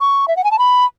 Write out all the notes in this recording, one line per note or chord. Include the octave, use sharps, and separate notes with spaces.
C#6
E5
F#5
G#5
A5
B5